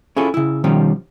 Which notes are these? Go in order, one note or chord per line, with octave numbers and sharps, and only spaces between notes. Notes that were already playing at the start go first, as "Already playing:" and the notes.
C#4 E4 F4 G#4 A4 C#5
C#3 E4
B2 D#3 F3 G3 C#4